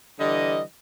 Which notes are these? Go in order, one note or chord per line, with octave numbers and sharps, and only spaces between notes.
D3 E3 G3 D#5